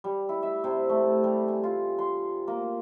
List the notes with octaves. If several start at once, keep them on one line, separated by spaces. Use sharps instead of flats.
G3
E4
E5
C3
A3
G3
G#5
F4
C6
A#3